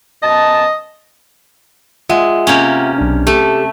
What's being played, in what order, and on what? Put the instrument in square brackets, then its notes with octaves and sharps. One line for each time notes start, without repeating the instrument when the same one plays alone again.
[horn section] F#2 B2 A5 [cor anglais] D#5
[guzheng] G#3 [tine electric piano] F4 E5 F#5
[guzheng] C3 A#3 C#4
[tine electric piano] B1 D4
[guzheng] A3 [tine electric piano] G4 A4